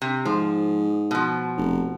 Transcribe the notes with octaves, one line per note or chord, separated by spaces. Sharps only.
C3
G#2 F3
B2 F3
F1